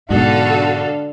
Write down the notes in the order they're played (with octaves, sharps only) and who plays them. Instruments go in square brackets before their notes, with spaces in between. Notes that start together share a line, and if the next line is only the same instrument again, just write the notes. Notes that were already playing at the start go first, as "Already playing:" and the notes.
[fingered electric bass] G#2 B2 [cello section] D3 A4 F5 [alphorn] D4 [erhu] F#4